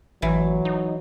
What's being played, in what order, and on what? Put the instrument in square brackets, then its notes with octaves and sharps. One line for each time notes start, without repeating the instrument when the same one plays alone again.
[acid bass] A1 [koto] E3 [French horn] F#3
[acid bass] D#4